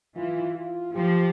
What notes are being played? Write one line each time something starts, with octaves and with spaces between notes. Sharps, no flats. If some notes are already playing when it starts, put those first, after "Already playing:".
E3 F4
F4
F3 G4